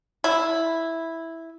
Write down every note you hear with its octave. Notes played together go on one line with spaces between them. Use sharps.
E4